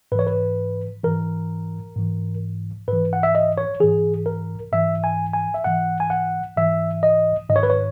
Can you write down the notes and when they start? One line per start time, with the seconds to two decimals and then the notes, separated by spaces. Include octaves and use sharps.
0.12 G#2 B4
0.15 E3 C#5
0.27 B4
1.03 G#2 E3 A#4
1.96 G#2 E3
2.88 G#2 E3 B4
3.13 F#5
3.23 E5
3.35 D#5
3.58 C#5
3.80 G#2 E3 G#4
4.26 A#4
4.72 G#2 E3 E5
5.04 G#5
5.33 G#5
5.54 E5
5.64 G#2 E3 F#5
6.00 G#5
6.10 F#5
6.57 G#2 E3 E5
7.03 D#5
7.50 G#2 D#3 D#5
7.56 C#5
7.63 B4
7.70 C#5